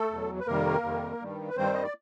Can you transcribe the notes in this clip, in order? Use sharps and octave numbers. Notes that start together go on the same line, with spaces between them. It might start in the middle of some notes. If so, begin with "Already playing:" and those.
Already playing: A3 A4
E2 B2 F#3
B4
F2 C3 D#3 G3 A#3 A#4
F2 C3 D#3 G3
G2 D#3 G3
B4
G2 D#3 G3 C4 C5
D#5
D5